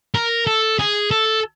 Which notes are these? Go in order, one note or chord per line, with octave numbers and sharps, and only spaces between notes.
A#4
A4
G#4
A4